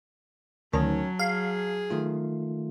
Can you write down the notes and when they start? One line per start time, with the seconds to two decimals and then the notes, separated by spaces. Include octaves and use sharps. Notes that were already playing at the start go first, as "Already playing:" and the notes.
0.73 D2 D#3 F#3 C#4 A5
1.19 G#4 F5
1.90 D#3 A3 F4